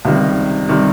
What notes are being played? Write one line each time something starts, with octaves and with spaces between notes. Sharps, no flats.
C#2 C3 D#3 G3
C3 D#3 G3